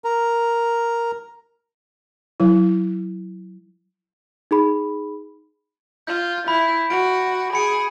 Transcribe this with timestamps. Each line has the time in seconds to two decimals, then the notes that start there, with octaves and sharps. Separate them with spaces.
0.04 A#4
2.40 F#3 E4
4.51 D#4 G#4 B5
6.07 F4 G6
6.48 E4 B5
6.90 F#4 D7
7.53 G#4 B5 C#7 D7